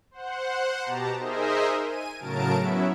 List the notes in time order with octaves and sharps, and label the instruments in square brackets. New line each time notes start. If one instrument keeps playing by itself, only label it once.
[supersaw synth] C5 F#5
B2 G4 A5 A#5
D#4 G#4 A#4 C5 D#5 E5
G#5 D#7
A2 C#3 F#3 A#4 A5 D7
F#3 B3 C#4 E4 E5